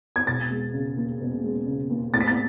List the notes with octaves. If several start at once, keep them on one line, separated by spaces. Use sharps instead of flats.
G#6
E1 A6
G#3
C#3
D#2
E1
G#3
C#3
D#2
A2 A6
B6
A6